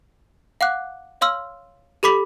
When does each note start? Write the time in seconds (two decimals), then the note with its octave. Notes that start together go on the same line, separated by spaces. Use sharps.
0.61 F5 F#5 D6 F#6
1.21 C#5 F5 C6 E6 F6
2.03 G4 A4 B5 D6 B6 F#7